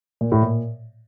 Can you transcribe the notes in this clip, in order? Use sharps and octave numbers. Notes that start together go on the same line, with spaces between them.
A#2
A2
A#2